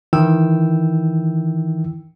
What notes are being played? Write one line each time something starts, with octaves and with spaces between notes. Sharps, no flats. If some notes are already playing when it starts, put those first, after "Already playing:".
D#3 E3 E4 G5 E6